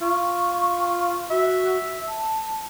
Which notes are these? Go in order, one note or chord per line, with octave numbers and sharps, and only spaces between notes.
F4 C#6
F#4 E5
A5